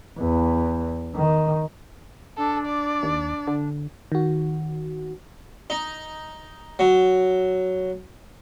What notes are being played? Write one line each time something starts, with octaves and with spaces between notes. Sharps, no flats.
E2
D#3
D4 A4
D5
D#2
D3
D#3 F#4
D#4
F#3